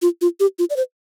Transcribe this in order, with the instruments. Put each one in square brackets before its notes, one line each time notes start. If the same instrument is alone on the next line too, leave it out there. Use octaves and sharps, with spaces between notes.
[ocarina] F4
F4
G4
F4
D5
C5